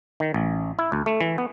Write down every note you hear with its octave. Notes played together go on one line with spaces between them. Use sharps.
D#3
A1
E4
D2
A3
E3
B3